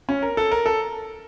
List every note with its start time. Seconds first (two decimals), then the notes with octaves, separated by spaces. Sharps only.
0.09 C#4
0.22 A#4
0.37 A4
0.51 A#4
0.66 A4